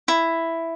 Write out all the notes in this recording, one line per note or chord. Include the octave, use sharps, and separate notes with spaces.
E4